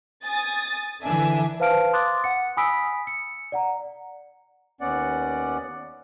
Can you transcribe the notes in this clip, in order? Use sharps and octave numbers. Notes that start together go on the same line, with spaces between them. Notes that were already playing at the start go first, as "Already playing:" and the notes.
G#5 D#6 A6
D3 E3 D4 E5 G#5
B4 C5 F5 A5 F6 D7
C6 D6 D#6 F#6 A6
F#5 C#7
G#5 B5 D#6 E6 B6 D7
C#7
D5 F#5 A#5
D#2 B3 C#4 D5 F#5